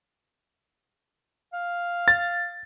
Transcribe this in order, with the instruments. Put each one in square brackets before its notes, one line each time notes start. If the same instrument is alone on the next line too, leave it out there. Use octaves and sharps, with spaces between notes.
[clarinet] F5
[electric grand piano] A6